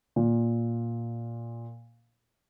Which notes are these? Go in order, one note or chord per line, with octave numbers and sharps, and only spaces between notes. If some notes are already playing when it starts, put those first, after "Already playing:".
A#2